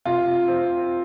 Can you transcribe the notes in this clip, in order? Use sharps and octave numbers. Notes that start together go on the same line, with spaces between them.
C3 F4
C4